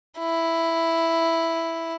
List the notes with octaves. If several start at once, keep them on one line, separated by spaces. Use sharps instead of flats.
E4